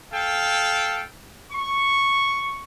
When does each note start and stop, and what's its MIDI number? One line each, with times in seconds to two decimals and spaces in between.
0.13 1.04 69
0.13 1.04 77
0.13 1.04 79
1.52 2.60 85